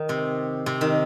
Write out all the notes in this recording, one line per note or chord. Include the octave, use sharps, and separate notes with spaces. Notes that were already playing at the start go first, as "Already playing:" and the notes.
Already playing: D#3
C3
C3
D#3